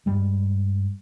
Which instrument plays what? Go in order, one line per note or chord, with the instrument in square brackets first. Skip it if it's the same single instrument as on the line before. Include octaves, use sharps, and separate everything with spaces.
[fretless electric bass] G2 G3 G#3